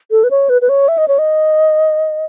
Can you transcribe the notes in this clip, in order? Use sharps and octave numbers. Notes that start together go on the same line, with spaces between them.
A4
B4
C#5
B4
B4
C#5
E5
D#5
C#5
D#5